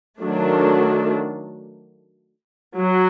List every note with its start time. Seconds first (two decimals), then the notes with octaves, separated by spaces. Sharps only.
0.20 D#3 F#3 A3 D4
2.78 F#3